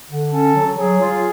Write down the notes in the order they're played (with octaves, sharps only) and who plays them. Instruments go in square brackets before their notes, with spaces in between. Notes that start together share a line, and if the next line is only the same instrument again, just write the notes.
[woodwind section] D3
[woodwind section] C#4 [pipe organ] A4
[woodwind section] F#3
[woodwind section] F#3 [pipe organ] G#4
[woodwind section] F4